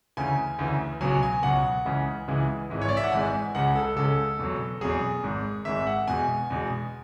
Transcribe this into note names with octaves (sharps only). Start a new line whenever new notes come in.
D2 C#3 E3 G#5
D2 C#3 E3
C#2 B2 F#3 G#5
G#5
C#2 B2 F#3 F#5
C#2 C#3 E3 G#3
C#2 C#3 E3 G#3
G#1 G#2 E3 G#3
C#5
D5
E5
F#5
G#1 G#2 E3 G#3 G#5
C#2 C#3 G#3 F#5
A4
C#2 C#3 G#3 A4
E2 B2 F#3
E2 B2 F#3 G#4
G#1 G#2 G#3
G#1 G#2 G#3 E5
F#5
E2 B2 G#3 G#5
E2 B2 G#3